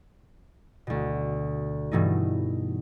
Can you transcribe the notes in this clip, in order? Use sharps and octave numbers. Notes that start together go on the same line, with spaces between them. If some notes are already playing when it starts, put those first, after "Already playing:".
D2 B2
G2 B2 E3 A3 D#4